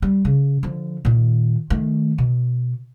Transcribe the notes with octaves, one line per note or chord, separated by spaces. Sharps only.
G3
C#3
D3 F3
A#2 D#3
D#3 A3
B2